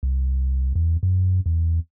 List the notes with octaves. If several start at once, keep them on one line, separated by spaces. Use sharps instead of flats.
C2
E2
F#2
E2